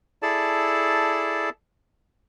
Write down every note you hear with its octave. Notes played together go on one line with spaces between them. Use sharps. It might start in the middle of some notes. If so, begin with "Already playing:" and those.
E4 G#4 A4 D5 A5